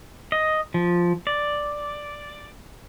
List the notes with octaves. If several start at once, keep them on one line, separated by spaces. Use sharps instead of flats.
D#5
F3
D5